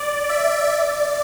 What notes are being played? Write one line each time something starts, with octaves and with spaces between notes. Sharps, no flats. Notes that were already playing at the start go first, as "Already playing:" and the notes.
Already playing: D5
E5
D5